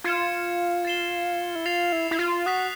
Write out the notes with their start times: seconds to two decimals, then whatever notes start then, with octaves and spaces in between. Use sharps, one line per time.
0.04 F4 G#6 C#7 E7
0.85 A6 C7 E7 G7
1.55 E4
1.66 F4 A6 C7 F7
1.92 E4
2.11 E4
2.19 F4
2.46 F#4 D#6 F#6 B6